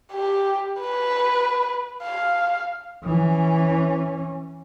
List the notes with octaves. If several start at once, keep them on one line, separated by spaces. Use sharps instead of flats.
G4
B4
F5
E3 C#4